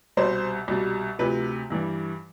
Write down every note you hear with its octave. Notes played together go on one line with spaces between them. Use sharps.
C2 B2 G3 C5
C2 B2 G3
D2 C3 F3 B4
G2 E3 G3